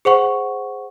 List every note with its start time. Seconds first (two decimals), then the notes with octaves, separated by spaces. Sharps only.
0.05 G#4 C5 F#5 C#6